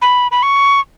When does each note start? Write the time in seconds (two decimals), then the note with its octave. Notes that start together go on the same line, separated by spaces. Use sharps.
0.02 B5
0.32 B5
0.43 C#6